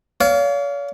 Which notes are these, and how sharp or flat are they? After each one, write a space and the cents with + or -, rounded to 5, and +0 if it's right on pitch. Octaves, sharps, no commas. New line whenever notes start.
C#5 +45 F5 +0